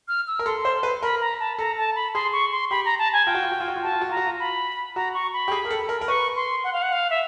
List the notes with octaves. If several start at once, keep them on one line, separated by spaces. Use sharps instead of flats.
F6
E6
A#4
A4 C6
C5
B4
A#4 B5
A#5
A5
A4 A#5
A5
B5
G#4 C6
C#6
C6
G4 B5
A#5
A5
G#5
F4 G5
F#4
F4
F#4
F4
F#4
F4
F#4 A5
F4
F#4
F4 A#5
F#4
F4
B5
F#4 A#5
C#6
B5
G4
G#4
A#4
A4
A#4
A#4
B4 C#6
C6
F#5
F5
F#5
F5
E5